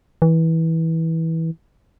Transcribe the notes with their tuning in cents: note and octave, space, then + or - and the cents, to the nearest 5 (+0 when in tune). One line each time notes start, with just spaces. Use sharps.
E3 -20